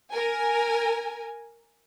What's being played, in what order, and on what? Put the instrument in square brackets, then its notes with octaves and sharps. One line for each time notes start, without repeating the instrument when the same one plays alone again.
[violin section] A#4 G#5